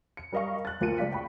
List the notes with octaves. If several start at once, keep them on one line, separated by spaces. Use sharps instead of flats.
C#7
G3 A#4 D#5 F5 C#6
F#6 A6
D2 F3 A#3 F4 C#7 D#7
C#2 D5 F5 B6
G5 B5 C#6